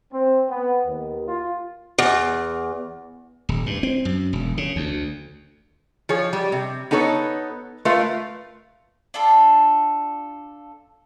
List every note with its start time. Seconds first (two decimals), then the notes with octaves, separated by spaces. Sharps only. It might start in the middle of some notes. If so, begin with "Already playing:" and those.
0.13 C4
0.50 B3
0.87 D#2
1.28 F4
1.98 E2
3.49 D#1
3.66 G2
3.83 C4
4.05 F#2
4.33 E1
4.58 C#3
4.76 D2
6.09 F3 G#4 C#5
6.33 G3
6.52 C3
6.91 B3 D#4 A4 B4 C#5
7.85 A3 F4 A#4 B4 F5
9.14 D4 F4 A4 B5